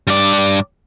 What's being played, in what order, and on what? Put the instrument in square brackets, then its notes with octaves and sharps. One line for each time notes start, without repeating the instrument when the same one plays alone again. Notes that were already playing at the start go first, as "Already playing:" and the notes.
[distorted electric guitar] G2 D5